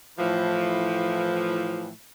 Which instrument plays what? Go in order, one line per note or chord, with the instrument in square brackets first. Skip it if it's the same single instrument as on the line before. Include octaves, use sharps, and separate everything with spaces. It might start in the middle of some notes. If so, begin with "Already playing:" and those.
[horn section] A2 E3 F3